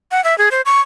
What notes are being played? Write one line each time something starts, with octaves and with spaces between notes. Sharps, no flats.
F#5
E5
G#4
C5
C#6